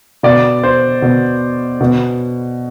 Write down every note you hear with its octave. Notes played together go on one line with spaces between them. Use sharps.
B2 D5
C5
B2
B2